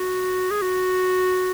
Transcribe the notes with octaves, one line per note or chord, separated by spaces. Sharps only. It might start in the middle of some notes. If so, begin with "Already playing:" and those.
Already playing: F#4
G#4
F#4